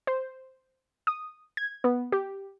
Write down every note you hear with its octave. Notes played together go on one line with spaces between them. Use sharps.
C5
D#6
G#6
B3
G4